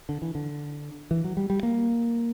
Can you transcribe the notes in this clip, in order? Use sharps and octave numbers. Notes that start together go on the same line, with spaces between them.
D3
E3
D3
E3
F#3
G3
G3
A#3